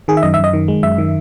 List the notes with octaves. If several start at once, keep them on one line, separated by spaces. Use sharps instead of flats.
D#3 G#4
E5
F#2 D#5
E5
F#2
D#5
D#3
G#3
F#2 E5
D#3